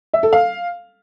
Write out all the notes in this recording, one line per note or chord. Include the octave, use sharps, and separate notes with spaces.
E5
A4
F5